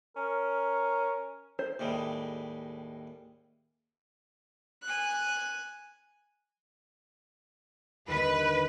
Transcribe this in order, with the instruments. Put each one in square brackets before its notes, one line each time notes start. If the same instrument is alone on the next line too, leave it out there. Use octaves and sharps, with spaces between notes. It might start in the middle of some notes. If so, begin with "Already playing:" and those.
[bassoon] C#4 [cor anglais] A#4
[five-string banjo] C5
[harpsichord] D#2 A2 G3 G#3
[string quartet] G#5 F#6
[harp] G1 D#2 [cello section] B4